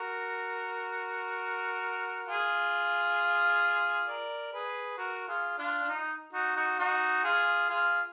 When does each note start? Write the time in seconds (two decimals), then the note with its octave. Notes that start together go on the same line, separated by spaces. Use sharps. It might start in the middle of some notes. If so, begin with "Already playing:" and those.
Already playing: F#4 A#4
2.27 F4 G#4
4.07 A#4 D5
4.53 G#4 B4
4.98 F#4 A#4
5.28 F4 G#4
5.58 D4 F4
5.82 D4
5.88 D#4
6.33 D#4 F#4
6.56 D#4 F#4
6.79 D#4 F#4
7.24 F4 G#4
7.69 F4 G#4